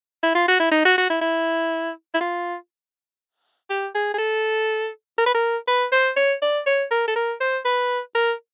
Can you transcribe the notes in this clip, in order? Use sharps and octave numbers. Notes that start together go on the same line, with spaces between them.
E4
F4
F#4
E4
D#4
F#4
F#4
E4
E4
E4
F4
G4
G#4
G#4
A4
A#4
B4
A#4
B4
C5
C#5
D5
C#5
A#4
A4
A#4
C5
B4
A#4